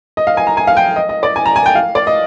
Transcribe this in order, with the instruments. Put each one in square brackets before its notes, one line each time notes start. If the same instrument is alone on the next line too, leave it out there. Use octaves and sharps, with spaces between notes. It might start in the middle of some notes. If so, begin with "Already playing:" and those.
[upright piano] D#5
F5
G#5
A#5
G#5
F5
G5
D#5
D#5
D5
G#5
A#5
G#5
G5
F5
D5
D#5